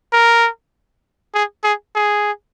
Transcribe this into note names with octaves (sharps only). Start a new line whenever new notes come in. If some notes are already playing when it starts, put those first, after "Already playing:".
A#4
G#4
G#4
G#4